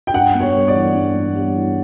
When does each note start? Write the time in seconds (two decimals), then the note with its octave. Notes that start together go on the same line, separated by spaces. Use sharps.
0.07 G5
0.13 G2 F#5
0.34 B3
0.40 C#5
0.54 G3
0.68 D5
0.74 E3
0.94 G2
1.15 B3
1.35 G3
1.55 E3